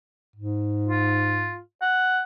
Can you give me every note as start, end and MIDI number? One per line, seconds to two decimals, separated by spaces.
0.36 1.60 44
0.87 1.60 65
1.82 2.22 78